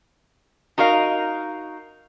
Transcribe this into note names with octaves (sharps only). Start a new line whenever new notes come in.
D#4 F#4 A#4 D#5 F5